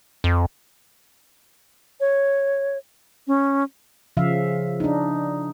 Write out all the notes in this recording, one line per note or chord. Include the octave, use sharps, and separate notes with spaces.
F2
C#5
C#4
C#3 F3 E5 F5
D4 D#4